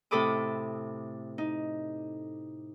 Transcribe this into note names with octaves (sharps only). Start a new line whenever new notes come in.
A2 C3 A4 B5 D6 D#6
D#4